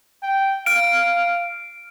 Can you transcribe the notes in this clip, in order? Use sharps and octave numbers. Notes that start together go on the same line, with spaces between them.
G5
F5 F6 D7